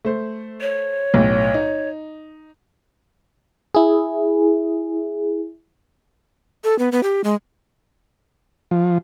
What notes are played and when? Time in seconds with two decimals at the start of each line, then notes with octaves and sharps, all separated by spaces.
0.05 A3 C5
0.61 C#5
1.14 B1 A2
1.54 D#4
3.75 E4 G#4
6.64 A4
6.79 B3
6.92 B3
7.03 G4
7.24 G#3
8.71 F3